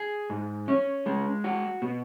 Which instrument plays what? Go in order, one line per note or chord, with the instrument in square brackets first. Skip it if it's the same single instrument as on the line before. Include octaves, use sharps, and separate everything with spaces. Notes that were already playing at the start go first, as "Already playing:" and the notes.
Already playing: [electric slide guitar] G#4
G#2
C#4
G#3
F#4
B2